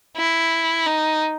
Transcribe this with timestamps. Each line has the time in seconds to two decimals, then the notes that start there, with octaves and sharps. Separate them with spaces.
0.17 E4
0.86 D#4